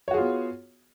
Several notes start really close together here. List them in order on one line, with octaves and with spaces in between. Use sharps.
C#5 F#4 G#4 F4 B3